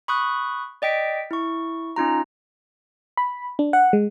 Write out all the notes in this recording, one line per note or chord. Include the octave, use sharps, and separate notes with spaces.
B5 C#6 D#6 F#6
D5 D#5 G5 B6 D7
E4 C#6
C#4 D#4 F4 A#5
B5
D4
F#5
G#3